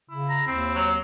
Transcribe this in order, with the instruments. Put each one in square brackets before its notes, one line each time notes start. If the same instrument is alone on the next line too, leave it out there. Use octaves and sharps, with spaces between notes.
[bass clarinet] C#3 [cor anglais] E4
[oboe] A#5
[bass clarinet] D#2 [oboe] C4
[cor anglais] F#3